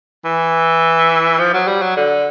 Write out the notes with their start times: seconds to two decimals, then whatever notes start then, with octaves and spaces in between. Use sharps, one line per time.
0.25 E3
1.39 F3
1.54 F#3
1.68 G3
1.82 F#3
1.97 D3